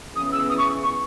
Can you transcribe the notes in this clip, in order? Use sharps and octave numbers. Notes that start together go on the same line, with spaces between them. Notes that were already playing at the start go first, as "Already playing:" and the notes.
C#3 E3 B3 D#6
E6
D#6
C#6
C#6